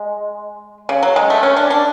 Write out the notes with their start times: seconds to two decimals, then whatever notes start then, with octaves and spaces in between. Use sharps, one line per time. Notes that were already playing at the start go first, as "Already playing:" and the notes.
Already playing: G#3
0.89 C#3
1.03 F#3
1.16 G#3
1.30 A3
1.43 C#4
1.57 D4
1.70 D4